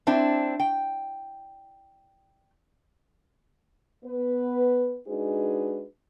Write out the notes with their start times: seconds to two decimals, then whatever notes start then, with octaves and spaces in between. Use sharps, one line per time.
0.07 C4 D4 E4
0.60 G5
4.04 B3 B4
5.07 G#3 D4 D#4 F#4 G#4 B4